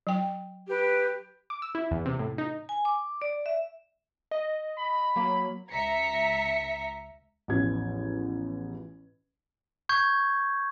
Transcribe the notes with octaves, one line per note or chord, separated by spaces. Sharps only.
F#3 G5
G4 B4
D6
E6
E4
E2
C3
A2
D#4
G#5
D6
D5
E5
D#5
B5
F#3 A#3
C#2 E5 A#5 B6 C#7
A1 E2 F3 G#6
C#6 G6 G#6